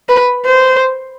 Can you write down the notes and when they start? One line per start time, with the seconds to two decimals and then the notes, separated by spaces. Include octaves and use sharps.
0.09 B4
0.46 C5